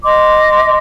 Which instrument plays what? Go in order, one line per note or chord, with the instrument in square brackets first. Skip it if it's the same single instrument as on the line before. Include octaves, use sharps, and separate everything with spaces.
[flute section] D#5 C6 D6